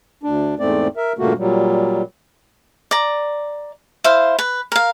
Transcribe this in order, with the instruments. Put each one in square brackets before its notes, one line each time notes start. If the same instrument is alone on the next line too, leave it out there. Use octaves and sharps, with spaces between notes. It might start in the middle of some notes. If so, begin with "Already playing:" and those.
[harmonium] D2 D4
E2 G#2 A3 C4 D5
A#4 E5
G2 A#2 C#3 A3 A#3 F#4
A#2 F#3 G3
[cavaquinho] D5 A#5
E4 C5 F5
B4
A#4 F5